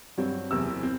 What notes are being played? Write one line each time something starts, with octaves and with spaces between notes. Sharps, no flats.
G2 F#3 C4
F#1 E2 C3 E3 E6
C4